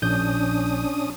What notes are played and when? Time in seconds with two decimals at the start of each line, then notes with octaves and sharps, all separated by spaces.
0.02 A#1 C#4 D4 D#6 G6